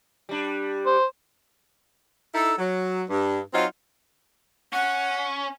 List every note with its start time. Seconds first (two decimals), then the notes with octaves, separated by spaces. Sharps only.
0.29 G3 D4
0.86 C5
2.34 D#4 E4 A4
2.58 F#3
3.10 G2
3.54 F#3 C4 D#4 F4
4.73 C#4 F#5